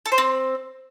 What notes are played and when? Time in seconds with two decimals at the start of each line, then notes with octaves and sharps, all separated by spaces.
0.06 A4
0.12 C5
0.18 C4